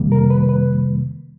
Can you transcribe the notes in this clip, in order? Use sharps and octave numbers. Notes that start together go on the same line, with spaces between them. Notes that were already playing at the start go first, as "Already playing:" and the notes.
Already playing: F2 C3 D#3 G3 A#3
A#4
B4
B4